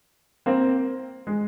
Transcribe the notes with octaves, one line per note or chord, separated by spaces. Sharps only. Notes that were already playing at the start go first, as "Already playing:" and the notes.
A#3 C4
G#3